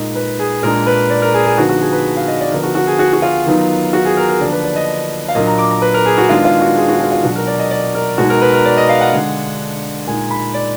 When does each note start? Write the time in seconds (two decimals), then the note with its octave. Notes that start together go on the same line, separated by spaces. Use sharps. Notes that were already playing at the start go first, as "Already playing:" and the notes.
Already playing: A#2 G#3 D#4 D#5
0.15 B4
0.39 G#4
0.63 A#2 G#3 D4 A#4
0.87 B4
1.10 D5
1.22 A#4
1.34 G#4
1.46 G#4
1.58 D3 F3 B3 D#4 F#4
1.69 F#4
1.81 G#4
1.92 B4
2.17 F5
2.28 D#5
2.40 D5
2.52 D3 F3 B3 A#4
2.63 F#4
2.75 F#4
2.87 G#4
2.99 F#4
3.13 F#4
3.22 F4
3.46 D#3 F#3 B3 D#4
3.93 F#4
4.05 G#4
4.17 A#4
4.29 A#4
4.40 D3 F3 A#3 D4 D5
4.52 B4
4.64 D5
4.76 D#5
5.28 F5
5.35 A#2 F#3 A#3 D4 D#5
5.46 A#5
5.58 D6
5.71 A#5
5.82 B4
5.94 A#4
6.06 G#4
6.18 F#4
6.29 D#3 G#3 B3 D4 F4
6.45 F4
6.61 F#4
6.76 G#4
6.88 F#4
7.01 F4
7.12 F4
7.24 B2 F#3 D4 F#4
7.36 A#4
7.47 D5
7.59 D#5
7.71 D5
7.95 A#4
8.18 B2 G#3 D#4 F#4
8.30 A#4
8.42 B4
8.54 A#4
8.65 D5
8.77 D#5
8.89 F5
9.01 F#5
9.13 D3 G#3 D4
10.07 A#2 G#3 D#4 G#5
10.30 B5
10.54 D5